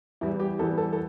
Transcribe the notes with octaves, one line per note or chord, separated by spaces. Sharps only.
E2 E3 G3 E4
G4
E2 E3 G3 A4
A4
A4